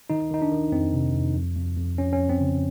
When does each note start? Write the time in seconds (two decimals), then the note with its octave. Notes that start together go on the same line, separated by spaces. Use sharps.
0.10 D#3 D#4
0.31 D#3 D#4
0.42 D4
0.52 D#3
0.72 F2 C4
0.93 C3
1.15 F2
1.35 F2
1.56 F2
1.77 F2
1.98 F3 C#4
2.13 C#4
2.19 F2
2.29 C4
2.40 C#3